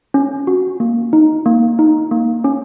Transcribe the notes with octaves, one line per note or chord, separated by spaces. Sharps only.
C#4
F#4
A#3
D#4
A#3
D#4
A#3
C#4